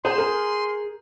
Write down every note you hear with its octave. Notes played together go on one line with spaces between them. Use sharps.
G#4 C5 F#5 C6 G6
A#4